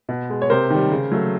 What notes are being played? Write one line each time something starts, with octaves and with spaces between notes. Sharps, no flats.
B2
G#3
C#5
C3 A#4 C5
D#3 G3
C#3
F#3 A3